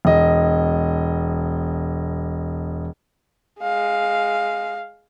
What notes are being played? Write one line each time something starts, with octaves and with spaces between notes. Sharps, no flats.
E1 D#5
G#3 F5